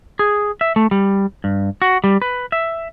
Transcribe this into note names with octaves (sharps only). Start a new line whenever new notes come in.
G#4
E5
A3
G3
G2
F#4
G3
B4
E5